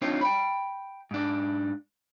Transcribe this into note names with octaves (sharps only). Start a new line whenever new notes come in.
C4 D4 D#4 F4 C5 C#5
G5 B5
G#2 D4